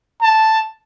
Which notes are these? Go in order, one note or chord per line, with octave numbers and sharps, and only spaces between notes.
A5